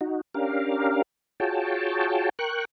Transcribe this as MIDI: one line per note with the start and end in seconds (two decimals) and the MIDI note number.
0.01 0.21 63
0.01 0.21 66
0.34 1.02 61
0.34 1.02 62
0.34 1.02 67
0.34 1.02 70
0.34 1.02 77
1.40 2.29 65
1.40 2.29 66
1.40 2.29 68
1.40 2.29 73
1.40 2.29 79
1.40 2.29 81
2.39 2.65 70
2.39 2.65 79
2.39 2.65 85
2.39 2.65 90